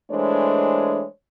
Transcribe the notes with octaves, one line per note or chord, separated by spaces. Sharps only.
E3 G#3 A3 D4 C5 C#5